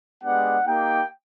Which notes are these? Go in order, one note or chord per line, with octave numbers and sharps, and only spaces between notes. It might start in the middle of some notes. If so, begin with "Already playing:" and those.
G#3 B3 D4 G4 F#5
A#3 D#4 G4 G5